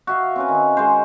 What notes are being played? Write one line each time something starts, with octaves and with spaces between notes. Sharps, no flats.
F#4 E5 F5
C4 C#4 B4
D#3
G#3 C5